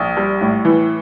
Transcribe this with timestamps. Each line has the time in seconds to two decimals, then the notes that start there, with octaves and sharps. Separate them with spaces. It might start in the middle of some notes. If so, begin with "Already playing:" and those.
Already playing: A#1
0.17 G3
0.41 A2
0.65 E3